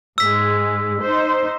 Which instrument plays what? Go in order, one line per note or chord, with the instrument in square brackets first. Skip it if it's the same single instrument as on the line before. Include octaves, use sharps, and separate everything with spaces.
[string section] G#2 G#3 [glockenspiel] E6 B6
[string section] D#4 C5